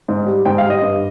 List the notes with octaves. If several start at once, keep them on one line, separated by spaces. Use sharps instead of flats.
G#2
G3
G#2 G5
F5
G3
D#5
G2